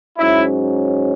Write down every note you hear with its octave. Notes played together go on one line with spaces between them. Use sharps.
G#2 F#3 C#4 E4